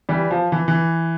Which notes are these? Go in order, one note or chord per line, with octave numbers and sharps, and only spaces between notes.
E3 G3
F3
E3
E3